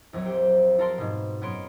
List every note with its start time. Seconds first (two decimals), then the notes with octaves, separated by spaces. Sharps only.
0.13 A#1 F2 F#3 C#5
0.26 G4 C5
0.78 F4 A4 A#4 D5 A5 C6
0.98 G#2 B2
1.41 F#2 B3 F4 C#5 C6 D7